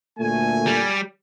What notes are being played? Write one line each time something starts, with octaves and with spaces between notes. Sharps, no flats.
D2 A#2 A3 G#5
G3